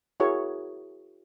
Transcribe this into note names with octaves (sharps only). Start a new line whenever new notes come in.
E4 F#4 G#4 A#4 C#5